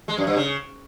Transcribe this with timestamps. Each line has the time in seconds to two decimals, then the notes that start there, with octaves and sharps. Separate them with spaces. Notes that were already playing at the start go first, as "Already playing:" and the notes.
0.08 G#3
0.17 F#2
0.27 G2
0.36 C#3